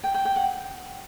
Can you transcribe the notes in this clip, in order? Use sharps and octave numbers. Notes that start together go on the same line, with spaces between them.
G5
G5
G5
F#5